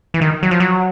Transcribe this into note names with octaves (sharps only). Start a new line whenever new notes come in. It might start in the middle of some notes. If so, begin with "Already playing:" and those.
E3
D#3
F#3
F3
F#3